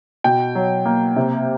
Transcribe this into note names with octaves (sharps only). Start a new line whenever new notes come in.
B2 G5
F#3
A#3
C3